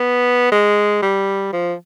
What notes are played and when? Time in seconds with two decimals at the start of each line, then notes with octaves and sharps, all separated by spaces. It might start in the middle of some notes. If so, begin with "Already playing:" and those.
Already playing: B3
0.52 G#3
1.02 G3
1.53 F3